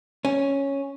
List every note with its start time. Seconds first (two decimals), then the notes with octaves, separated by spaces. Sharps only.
0.25 C#4